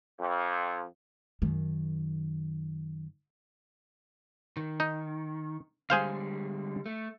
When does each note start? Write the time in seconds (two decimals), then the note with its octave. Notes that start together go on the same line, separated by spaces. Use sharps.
0.20 F2
1.42 F#2 D#3
4.57 D#3
4.80 D#4
5.90 D3 G3 G#3 G#4 C5 F5
6.86 A3